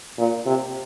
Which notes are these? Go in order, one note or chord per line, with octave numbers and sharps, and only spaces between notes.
A#2
C3